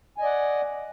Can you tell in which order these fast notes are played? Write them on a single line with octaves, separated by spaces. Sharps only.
G#5 D#5 D5 F#5